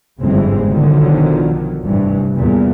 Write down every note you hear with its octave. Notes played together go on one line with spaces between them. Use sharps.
G1 F2 G#2 E3 G#3 C4
B1 B2 D3 D#3 F3 F#3
F1 C2 G2 E3
E2 A#2 E3 G3